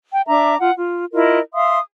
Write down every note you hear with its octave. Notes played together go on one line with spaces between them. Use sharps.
G5
D4 E5 A#5 D6
F4 F#5
F4
E4 F4 A#4 D#5
E5 F5 C6 D#6